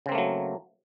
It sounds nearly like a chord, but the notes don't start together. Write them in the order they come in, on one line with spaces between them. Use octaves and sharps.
C#3 C4 A#3 A3 F#3